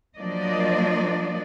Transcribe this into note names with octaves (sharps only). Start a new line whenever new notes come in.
F3 F#3 A#3 D4 D5 D#5